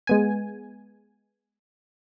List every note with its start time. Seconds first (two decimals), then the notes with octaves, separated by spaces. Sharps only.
0.07 G#3 B3 G#5